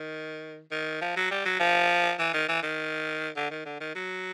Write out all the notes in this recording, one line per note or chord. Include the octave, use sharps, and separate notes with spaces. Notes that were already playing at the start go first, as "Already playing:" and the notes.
Already playing: D#3
D#3
F3
F#3
G3
F#3
F3
E3
D#3
E3
D#3
D3
D#3
D3
D#3
F#3